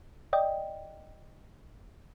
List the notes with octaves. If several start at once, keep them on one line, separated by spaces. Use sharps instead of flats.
D5 D#5 G5